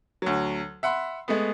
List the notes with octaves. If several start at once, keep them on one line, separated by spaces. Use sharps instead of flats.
D2 F#3
E5 F#5 B5 C6
G#3 A3 B3